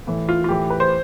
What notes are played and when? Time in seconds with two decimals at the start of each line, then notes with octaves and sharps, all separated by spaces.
0.07 A2 E3
0.29 F4
0.44 F4
0.49 A2 E3 G4
0.70 B4
0.80 C5